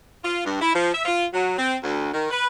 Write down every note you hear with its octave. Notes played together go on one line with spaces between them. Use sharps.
F4
G2
E4
F3
E5
F4
F#3
C4
D2
D#3
B4